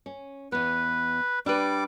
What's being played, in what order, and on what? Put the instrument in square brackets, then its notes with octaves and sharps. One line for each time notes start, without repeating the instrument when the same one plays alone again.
[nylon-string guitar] C#4
[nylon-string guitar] E2 B3 [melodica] B4
[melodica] G3 D6 [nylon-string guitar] D4 B4